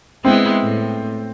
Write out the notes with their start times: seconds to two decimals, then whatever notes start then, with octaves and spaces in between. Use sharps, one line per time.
0.25 G#3 B3 C4 E4
0.62 A2